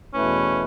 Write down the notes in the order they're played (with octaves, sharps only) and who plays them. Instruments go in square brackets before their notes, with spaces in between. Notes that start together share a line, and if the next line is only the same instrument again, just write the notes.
[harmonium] E2 B2 A3 E4 B4 [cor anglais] C#4